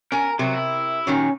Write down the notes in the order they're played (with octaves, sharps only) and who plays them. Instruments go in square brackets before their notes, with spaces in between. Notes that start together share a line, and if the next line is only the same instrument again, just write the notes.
[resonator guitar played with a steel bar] C#4 G#5 [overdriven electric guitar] A#4
[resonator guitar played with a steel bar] C3 A#4 [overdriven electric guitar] F#3
[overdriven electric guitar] E4
[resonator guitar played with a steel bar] A#2 D#3 F#3 [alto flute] C#4